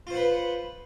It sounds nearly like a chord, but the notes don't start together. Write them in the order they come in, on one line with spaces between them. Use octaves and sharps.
F4 C5 F#5 B4